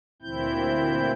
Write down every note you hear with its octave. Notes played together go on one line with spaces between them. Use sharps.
D2 A#2 E3 C4 E4 G6